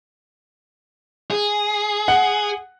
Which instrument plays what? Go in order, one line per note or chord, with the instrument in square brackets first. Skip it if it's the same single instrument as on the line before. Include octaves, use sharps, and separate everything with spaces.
[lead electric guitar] G#4
[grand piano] F#5